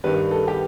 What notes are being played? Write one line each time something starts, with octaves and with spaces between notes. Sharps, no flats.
G2 D#3 G3 B4
A4
G4